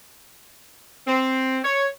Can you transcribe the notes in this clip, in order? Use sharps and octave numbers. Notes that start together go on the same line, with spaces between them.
C4
C#5